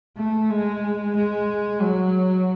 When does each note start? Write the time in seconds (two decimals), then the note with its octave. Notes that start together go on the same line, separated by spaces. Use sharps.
0.17 A3
0.50 G#3
1.15 G#3
1.82 F#3